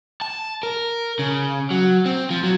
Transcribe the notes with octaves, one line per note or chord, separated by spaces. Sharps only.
A5
A#4
C#3
F#3
C4
F3
F#3